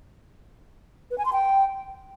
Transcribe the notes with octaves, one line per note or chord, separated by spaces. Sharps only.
B4
G#5
C6
G5